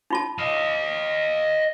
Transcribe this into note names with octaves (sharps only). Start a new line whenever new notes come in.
D#4 F4 A5
D#5 F5